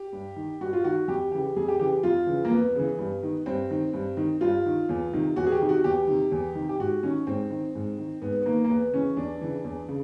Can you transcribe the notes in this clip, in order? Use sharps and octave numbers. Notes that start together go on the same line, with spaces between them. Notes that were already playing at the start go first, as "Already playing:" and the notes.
Already playing: G4
G2
D#3
G2 F#4
F4
D#3 F#4
F2 G4
C#3 E3 G4
F2 G#4
G4
C#3 E3 G4
F2 F4
C#3 E3
A#3
F2 B3
C#3 E3
G2
D#3
G2 C4
D#3
G2
D#3
G2 F4
D#3
E2
C3 D#3
E2 F#4
G#4
G4
C3 D#3
F#4
E2 G4
C3 D#3
E2
C3 D#3
G4
G#2 F#4
D#3 C#4
G#2 C4
D#3
G#2
D#3
G#2 B3
B3
D#3 A#3
A#3
E2 B3
C#3 E3 C#4
E2 D4
C#3 E3
E2
C#3